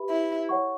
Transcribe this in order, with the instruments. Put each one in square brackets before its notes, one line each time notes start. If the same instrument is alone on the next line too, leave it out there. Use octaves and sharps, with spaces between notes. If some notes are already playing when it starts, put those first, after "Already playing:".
Already playing: [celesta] G4 B4 E5 B5
[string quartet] E4
[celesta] C#5 F#5 C#6